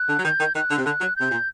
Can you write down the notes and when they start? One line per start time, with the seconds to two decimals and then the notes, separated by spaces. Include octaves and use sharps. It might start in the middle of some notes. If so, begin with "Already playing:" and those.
Already playing: F#6
0.09 D3
0.19 F#3
0.24 D#3 G6
0.40 D#3
0.55 D#3 F#6
0.71 D3
0.78 C3
0.85 D3 F#6
1.01 F#3
1.16 C3 G6
1.31 A#2